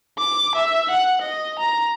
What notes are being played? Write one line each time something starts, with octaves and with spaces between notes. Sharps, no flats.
D6
E5
F#5
D#5
A#5